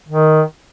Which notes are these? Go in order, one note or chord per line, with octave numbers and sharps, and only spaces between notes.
D#3